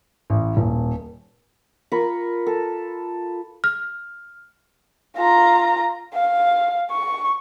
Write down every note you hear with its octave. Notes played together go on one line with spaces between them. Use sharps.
A1
D#1
F4 A#4 B5 C#6
A4
F6
F4 A#5
F5
C#6